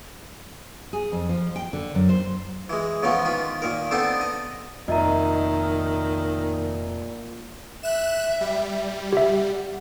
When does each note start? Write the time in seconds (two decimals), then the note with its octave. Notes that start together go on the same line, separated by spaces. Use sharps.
0.93 G#4
1.12 F2
1.29 F3
1.56 G5
1.73 D3
1.95 F#2
2.09 C5
2.69 E3 G#3
3.03 C#3 E3 F3 G#3 B3 C#4
3.25 D#3 F4 B5
3.62 A#2 D#3 A#4
3.91 B3 C4 D4 D#4 A4 C5
4.21 D#5
4.88 F1 A#2 D#3 D#5 E5 A#5
7.83 E5 F#6 E7
8.41 G3
9.13 G4 E5 F#5